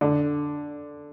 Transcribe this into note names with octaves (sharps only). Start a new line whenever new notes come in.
D3